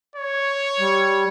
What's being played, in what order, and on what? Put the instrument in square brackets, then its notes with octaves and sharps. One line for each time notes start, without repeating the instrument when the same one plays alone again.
[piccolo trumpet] C#5
[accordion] G3